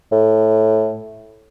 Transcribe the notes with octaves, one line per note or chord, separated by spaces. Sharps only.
A2